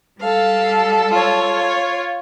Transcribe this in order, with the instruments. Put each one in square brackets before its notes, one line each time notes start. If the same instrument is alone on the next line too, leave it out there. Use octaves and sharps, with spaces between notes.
[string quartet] G3 A4 [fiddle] F5
[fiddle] F4 C#5